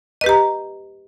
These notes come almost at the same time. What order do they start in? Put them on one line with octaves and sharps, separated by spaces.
D#5 B4 G4 A#5